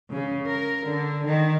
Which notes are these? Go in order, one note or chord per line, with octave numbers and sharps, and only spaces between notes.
C#3
A#4
D3
D#3